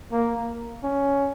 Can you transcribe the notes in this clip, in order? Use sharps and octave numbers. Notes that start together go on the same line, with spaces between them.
A#3
C#4